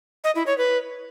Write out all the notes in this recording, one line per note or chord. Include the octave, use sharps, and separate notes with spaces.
D#5
E4
C#5
B4